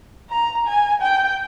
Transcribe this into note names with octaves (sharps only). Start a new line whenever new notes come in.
A#5
G#5
G5